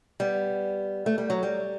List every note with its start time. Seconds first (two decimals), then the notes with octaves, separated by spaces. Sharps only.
0.20 G3 B3
1.06 A3
1.18 G3
1.30 F#3
1.43 G3